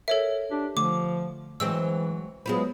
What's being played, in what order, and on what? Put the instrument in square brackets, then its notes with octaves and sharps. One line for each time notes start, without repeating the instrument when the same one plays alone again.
[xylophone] A4 C#5 E5 [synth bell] A#4
[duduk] D4 [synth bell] G4
[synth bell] D3 A3 [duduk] F3 [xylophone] D6
[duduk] E3 [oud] F#3 G#3 C4 [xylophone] E6
[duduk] F#3 [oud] G#3 F4 B4 [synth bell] B3 C5